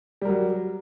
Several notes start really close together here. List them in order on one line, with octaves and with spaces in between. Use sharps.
G3 A#4 F#3